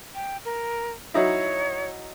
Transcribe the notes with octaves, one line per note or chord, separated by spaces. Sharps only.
G5
A#4
F#3 D#4 E4 C#5